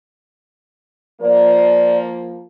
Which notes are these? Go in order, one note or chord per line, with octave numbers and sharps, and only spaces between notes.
F3 A#3 D5